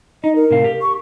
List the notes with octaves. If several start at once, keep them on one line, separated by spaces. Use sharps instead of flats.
D#4 D#5
A#4
A2 C3 F5
G4
C#6